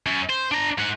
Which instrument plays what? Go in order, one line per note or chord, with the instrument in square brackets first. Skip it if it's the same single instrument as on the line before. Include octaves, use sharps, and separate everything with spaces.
[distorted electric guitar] F#2
C5
D4 A#5
G#2 F#5